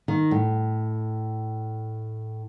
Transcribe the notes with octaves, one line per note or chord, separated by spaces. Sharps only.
D#3
A2